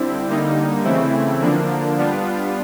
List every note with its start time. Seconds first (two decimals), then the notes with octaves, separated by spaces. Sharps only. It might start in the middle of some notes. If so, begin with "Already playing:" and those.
Already playing: D3 G3 C4 E4
0.28 D3 G3 A#3 D#4
0.84 C#3 E3 A3 C4 E4
1.42 D3 F3 A#3 D4
1.98 G3 B3 D4 F4